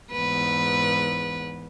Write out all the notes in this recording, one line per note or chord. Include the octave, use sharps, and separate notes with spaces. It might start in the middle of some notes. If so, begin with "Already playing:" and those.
E2 G#2 B4